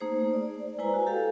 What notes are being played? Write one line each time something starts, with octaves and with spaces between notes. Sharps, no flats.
A3 A#3 D#4 G#4 C5
D5
G#3 E4 B4 C5 G#5 A#5
F#4
G4 A4 F5 G5